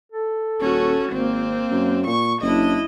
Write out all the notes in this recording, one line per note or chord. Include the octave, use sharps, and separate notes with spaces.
A4
D#1 C#4 F#4
G#1 A#3 C4
F#2
A#2 C#6
F#1 D4 E4 D#5